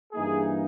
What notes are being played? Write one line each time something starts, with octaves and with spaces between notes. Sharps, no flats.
G2 E3 A#3 D#4 G#4